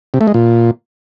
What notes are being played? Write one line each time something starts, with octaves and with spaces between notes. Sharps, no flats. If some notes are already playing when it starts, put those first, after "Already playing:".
C3
A3
G#3
A#2